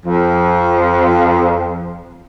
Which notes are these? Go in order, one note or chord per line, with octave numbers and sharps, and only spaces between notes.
F2 F3